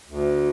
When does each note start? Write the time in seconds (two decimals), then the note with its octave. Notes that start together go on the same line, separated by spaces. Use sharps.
0.07 D2